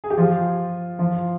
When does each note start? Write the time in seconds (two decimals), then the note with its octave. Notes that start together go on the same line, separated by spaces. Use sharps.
0.04 G#4
0.10 G4
0.18 F3 F4
0.99 F3 F4